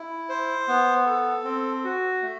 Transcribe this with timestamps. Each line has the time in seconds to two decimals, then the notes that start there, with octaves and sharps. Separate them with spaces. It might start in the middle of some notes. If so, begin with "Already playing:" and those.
Already playing: E4
0.29 C5
0.68 B3
1.06 A4
1.45 C4
1.84 F#4
2.22 A3